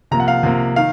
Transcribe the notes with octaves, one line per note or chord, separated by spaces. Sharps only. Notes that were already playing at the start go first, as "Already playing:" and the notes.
C3 F3 A#3 A#5
F#5
F5
C3 F3 A#3
D#3 F5